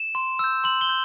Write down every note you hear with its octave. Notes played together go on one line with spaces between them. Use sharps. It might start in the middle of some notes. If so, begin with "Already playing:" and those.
Already playing: E7
C6
E6 G6
C6 F#7
G7
G6